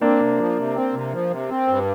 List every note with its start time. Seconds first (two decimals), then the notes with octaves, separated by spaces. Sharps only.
0.01 A#3 C4 D4
0.20 C3
0.38 F3
0.57 C3
0.76 C4
0.93 C3
1.13 F3
1.30 C3
1.49 C4
1.68 G2